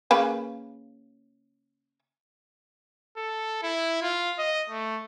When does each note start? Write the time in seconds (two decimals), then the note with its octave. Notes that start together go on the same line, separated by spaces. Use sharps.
0.11 C#3 A#3 B4
3.17 A4
3.63 E4
4.02 F4
4.38 D#5
4.70 A3